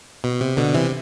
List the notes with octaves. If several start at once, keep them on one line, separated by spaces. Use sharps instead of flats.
B2
C3
B2 D3
C3 E3